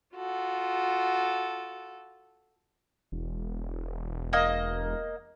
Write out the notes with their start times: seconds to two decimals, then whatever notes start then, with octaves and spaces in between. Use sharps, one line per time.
0.15 F4 F#4 A4
3.12 E1
4.33 A#3 D#5